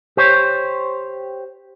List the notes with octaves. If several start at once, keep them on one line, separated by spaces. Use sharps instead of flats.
G4 C5 C#5